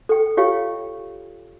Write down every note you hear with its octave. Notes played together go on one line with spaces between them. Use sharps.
A4 G5
F4 G4 C#5 D#5 F5 G5